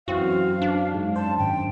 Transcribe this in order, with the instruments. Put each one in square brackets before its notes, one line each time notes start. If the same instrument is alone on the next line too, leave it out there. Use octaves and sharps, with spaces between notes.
[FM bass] F#2 [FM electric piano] E3 F#3 C4 [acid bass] F#4 [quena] F5
[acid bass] D4
[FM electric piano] G#2
[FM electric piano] C5 [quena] A5
[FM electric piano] G#1 [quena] G5